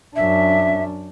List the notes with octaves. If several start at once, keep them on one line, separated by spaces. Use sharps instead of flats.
F#2 D4 E5